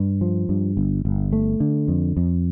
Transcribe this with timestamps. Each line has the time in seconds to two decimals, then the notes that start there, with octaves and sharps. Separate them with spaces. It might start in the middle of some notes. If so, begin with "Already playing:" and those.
Already playing: G2
0.21 F3
0.49 G2
0.77 G1
1.05 G1
1.33 A3
1.60 D3
1.88 F2
2.17 F2